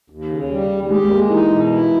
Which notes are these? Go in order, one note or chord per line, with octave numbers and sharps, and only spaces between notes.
D#2
C#3
G3
D#2
G#3 G4
G#3 A#3
E3 D#4
B2
E4